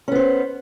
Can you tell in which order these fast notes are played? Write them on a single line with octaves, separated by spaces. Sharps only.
C#4 B3 C5